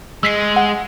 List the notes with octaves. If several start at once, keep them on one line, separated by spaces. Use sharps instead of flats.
G#3 E6 B6 C7
F#5